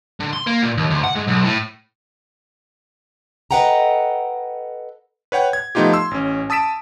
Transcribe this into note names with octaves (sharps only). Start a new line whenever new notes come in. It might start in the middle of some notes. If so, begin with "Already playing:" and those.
D3
C6
A#3
A#2
D#2
D2
F#5
G#2
B1
A2
A4 B4 D#5 F#5 G5 A#5
B4 C#5 F#5 G5
G#6
F3 A3 B3 D#4 F4 G4
C6 E6
A1 C#4
A5 D#6 E6 B6 D7 E7